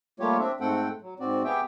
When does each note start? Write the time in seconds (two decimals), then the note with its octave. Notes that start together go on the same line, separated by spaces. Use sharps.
0.20 G3 A3 A#3 F4 G4 C#5
0.39 C4 D4 E5
0.61 G#2 A3 C4 A4 F#5 G5
1.02 F#3
1.20 G#2 C4 F#4 D5
1.44 B3 G4 G#4 E5 G5